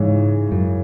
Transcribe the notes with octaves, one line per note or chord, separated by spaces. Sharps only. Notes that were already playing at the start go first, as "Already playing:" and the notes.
Already playing: G#2 C#3 E3
F#2